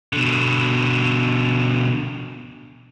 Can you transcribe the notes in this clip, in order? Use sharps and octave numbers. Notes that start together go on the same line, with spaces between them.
B2 D3